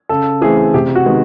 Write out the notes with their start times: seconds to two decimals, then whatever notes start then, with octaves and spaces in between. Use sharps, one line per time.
0.09 C#3 A4
0.41 E3 A3 C4 G#4
0.74 C3 G4
0.95 F#4
1.06 D#3 G#3 B3